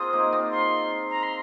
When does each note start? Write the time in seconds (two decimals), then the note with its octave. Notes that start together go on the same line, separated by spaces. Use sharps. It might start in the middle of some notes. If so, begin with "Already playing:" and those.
Already playing: C4 F4 G#4 A#4 D#6
0.13 A#3 D#4
0.32 C4 F4
0.51 C6
1.10 A#5
1.23 C6